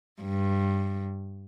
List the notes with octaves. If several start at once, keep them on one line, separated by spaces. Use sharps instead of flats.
G2